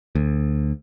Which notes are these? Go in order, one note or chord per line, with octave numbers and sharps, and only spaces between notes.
D2